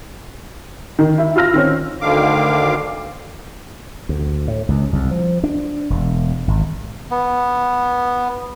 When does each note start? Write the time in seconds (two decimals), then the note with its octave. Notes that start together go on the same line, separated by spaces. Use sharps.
0.99 D#3
1.18 E4
1.36 F4 E6 F6 A#6
1.53 D#3 C4 C#4
2.01 D2 D3 D#3 F5 D6
4.09 D2
4.48 A2
4.69 C#2
4.93 C2
5.11 F3
5.44 D4
5.90 E1
6.48 G#1
7.11 B3